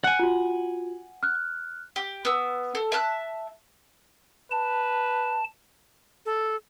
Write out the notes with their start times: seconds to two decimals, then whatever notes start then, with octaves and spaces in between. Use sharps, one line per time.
0.04 F#5 G#5 F#6 C#7
0.19 F4 F#4
1.23 F6 F#6
1.96 G4
2.25 B3 E6
2.75 A4
2.92 E5 A5 F6 F#6
4.51 B4 A5
6.26 A4